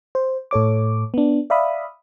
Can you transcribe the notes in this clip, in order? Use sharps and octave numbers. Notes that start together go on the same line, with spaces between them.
C5
A2 A4 C#5 D6
B3 D4
D5 E5 F5 B5 D#6